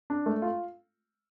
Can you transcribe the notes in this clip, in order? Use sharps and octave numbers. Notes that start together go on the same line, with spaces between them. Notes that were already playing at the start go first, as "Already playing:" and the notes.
D4
A3
F4